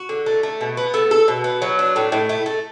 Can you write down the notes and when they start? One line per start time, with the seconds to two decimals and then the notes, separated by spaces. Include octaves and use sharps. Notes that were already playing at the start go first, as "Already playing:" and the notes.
Already playing: F#4
0.09 D3
0.26 A3
0.43 A3
0.61 B2
0.77 B3
0.94 A3
1.11 A4
1.28 B2
1.44 B3
1.62 F#3
1.79 D4
1.96 A2
2.12 A2
2.29 A3
2.46 A3